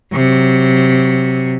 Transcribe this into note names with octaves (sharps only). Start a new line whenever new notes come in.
C3 F#3